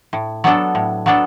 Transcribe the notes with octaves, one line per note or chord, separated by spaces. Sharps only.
A2
F#3 B3 D4 A4
A2
F#3 B3 D4 A4